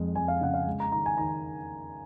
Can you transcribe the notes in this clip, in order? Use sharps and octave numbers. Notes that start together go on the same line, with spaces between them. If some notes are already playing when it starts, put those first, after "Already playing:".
Already playing: F2 G#3
F2 G#5
F5
C#3 F#5
F5
G#3
A#5
D#3 A#5
G#5
D#3 A#5